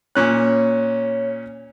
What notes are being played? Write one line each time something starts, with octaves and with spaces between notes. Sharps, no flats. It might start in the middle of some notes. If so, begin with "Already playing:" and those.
A#2 C#4 C#5 F#6